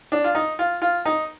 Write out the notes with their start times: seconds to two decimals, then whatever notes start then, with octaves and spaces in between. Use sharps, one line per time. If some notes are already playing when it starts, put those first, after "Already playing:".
0.12 D4
0.24 F4
0.35 D#4
0.59 F4
0.82 F4
1.05 D#4